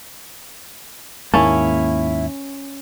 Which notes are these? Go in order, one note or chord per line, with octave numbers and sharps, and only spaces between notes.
D#2 G#2 A#3 C#4 E4 A5